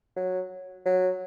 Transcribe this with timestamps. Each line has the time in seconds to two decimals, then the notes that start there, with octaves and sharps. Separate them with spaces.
0.16 F#3
0.85 F#3